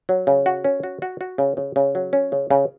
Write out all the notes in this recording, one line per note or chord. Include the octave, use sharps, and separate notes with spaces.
F#3
C#3
F#4
C#4
F#4
F#4
F#4
C#3
C#3
C#3
F#3
C#4
C#3
C#3